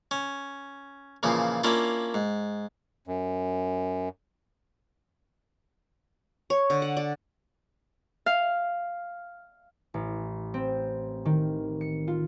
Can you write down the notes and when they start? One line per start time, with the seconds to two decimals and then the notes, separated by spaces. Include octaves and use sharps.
0.11 C#4
1.23 A#2 C#3 E3 F3
1.64 A#3 C#4 D4 E4 F4
2.14 G#2
3.07 F#2
6.50 C#5
6.70 D3
6.82 F#5
6.97 D5
8.26 F5
9.94 A1
10.54 C4
11.25 D#3
11.81 C#7
12.08 F4